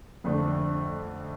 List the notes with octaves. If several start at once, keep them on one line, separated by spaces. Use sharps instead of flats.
F2 D3 A3 D4